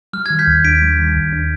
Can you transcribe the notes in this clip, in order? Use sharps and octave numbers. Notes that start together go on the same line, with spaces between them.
G3 F6
F6 G#6
D#3
G6 B6
D#2
D4 B6 D7
G3
D#3
D#2
D4